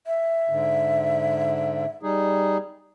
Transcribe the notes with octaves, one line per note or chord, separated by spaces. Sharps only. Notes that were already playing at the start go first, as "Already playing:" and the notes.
E5
G#2 D3
G3 D#4 G#4